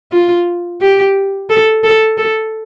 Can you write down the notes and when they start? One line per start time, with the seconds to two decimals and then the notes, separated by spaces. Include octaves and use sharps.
0.12 F4
0.81 G4
1.50 A4
1.84 A4
2.18 A4